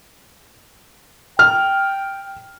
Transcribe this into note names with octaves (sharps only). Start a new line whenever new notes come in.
G5 F6